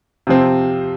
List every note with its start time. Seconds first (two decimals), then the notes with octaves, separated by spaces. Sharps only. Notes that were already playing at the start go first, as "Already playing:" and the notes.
0.27 C3 F3 C4